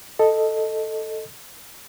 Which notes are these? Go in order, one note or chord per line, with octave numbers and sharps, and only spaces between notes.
A4 D#5